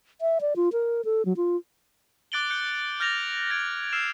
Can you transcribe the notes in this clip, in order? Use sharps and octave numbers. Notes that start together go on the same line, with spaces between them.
E5
D5
F4
A#4
A4
F#3
F4
D6 F#6 A6 D7 F#7 G7
F#6 G6 C#7 G7
F6 G6 A6 A#6 F7
G#6 A#6 D7
E6 F6 C7 E7